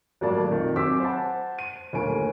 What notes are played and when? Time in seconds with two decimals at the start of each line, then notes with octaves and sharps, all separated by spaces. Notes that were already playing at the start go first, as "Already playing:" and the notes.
0.21 G#1 F#3 A3 A#3 D5 A5
0.49 F2 D#3
0.76 F#3 C4 G#5 D6 E6 B6
1.00 C5 F#5 A5
1.59 D#7
1.93 G1 D#2 A3 A#3 G#5 D7